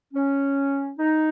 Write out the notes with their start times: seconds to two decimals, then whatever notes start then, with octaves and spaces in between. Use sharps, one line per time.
0.14 C#4
0.99 D#4